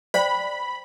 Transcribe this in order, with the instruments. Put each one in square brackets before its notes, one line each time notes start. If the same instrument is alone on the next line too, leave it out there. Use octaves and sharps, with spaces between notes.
[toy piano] C5 D5 G5 [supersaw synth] B5